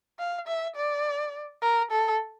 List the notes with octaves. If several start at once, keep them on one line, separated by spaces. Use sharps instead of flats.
F5
E5
D5
A#4
A4